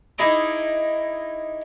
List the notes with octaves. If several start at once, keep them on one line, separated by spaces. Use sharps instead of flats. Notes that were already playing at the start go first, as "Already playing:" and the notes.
D#4 E4 G#4 D#5 D6